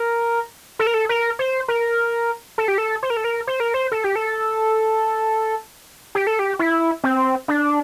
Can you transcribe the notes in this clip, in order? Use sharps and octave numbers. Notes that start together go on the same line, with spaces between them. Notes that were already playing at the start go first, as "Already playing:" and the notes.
Already playing: A#4
A4
A#4
A4
A#4
C5
A#4
A4
G4
A4
C5
A#4
A4
A#4
C5
A#4
C5
A4
G4
A4
G4
A4
G4
E4
C4
D4